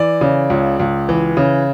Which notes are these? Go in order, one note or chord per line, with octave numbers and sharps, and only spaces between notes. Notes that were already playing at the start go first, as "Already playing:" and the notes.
Already playing: E3 D5
C#3
C#2
C#2
E3
C#3